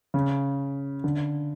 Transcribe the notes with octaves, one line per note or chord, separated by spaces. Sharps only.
C#3
D3